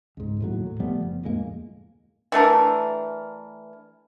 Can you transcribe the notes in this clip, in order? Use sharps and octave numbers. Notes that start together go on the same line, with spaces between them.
C#2 G#2
D#2 A2 F#3
A2
F3 G3 A3 B3
F#1
D1 F2 G#3 A#3
E3 A3 D4 A#4